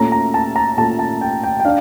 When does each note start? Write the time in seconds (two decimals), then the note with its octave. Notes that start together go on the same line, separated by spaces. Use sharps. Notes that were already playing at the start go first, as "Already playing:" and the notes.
Already playing: A#2 A3 C#4 A#5
0.12 A#5
0.34 A5
0.56 A#5
0.77 A#2 A3 C#4 A5
0.99 A5
1.21 G5
1.43 G5
1.60 G5
1.65 D4 F5